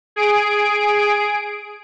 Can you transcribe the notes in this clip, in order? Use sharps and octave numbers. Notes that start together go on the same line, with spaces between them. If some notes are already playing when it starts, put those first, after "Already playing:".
G#4 D7